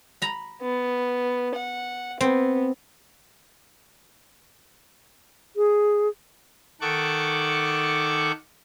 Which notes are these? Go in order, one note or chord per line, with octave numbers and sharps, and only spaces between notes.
A#5 B5
B3
F#5
B3 C4
G#4
D#3 A4 F#5 C#6 D6